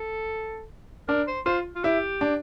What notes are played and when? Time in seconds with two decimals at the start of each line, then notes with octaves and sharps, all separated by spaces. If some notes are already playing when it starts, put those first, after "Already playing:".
Already playing: A4
1.08 D4 A#4
1.27 C5
1.46 F4 C5
1.76 F4
1.84 E4 G4
2.21 D4